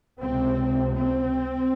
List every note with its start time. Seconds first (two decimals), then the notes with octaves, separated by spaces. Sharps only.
0.23 C#2 C3 C4
0.97 C4